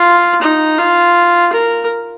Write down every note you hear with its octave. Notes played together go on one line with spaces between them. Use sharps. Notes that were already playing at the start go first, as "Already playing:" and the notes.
Already playing: F4
D#4
F4
A#4